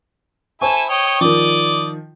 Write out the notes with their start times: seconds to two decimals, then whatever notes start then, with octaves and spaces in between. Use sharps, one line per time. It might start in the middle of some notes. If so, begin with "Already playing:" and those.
0.62 E4 A4 C5 G#5 C#6
0.89 C#5 D#5 G5
1.21 D#3 F3 D5 D#5